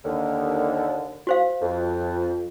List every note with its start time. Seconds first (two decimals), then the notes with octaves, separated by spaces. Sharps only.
0.05 D#2 D3
1.27 F#4 C5 F5
1.61 F2